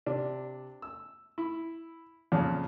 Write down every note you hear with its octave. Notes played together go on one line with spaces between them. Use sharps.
C3 D4
E6
E4
F2 A#2 C#3 F3